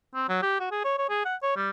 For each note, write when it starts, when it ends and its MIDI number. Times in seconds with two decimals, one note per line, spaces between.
0.14 0.25 60
0.29 0.41 54
0.42 0.58 67
0.60 0.68 66
0.71 0.80 68
0.84 0.94 73
0.98 1.06 73
1.09 1.24 68
1.25 1.35 78
1.42 1.55 73
1.56 1.70 55